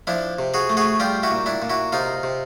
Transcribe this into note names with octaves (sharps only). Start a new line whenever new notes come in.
F3 D4 E4
C3
F#4 G#4
A3
F#4 G#4
G3 F4 G4
E4 F#4
A#2
D4 E4
A#2
E4 F#4
C3 D#4 F4
C3